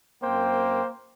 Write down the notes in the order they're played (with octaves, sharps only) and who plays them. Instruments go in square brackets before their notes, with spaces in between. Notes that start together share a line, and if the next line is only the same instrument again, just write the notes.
[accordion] F#2 C4 G5 [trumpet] A#3 [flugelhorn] C5